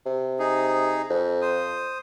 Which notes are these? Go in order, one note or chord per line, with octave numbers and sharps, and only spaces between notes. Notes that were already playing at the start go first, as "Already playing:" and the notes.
C3
D#4 G#4
F2
C5 D#6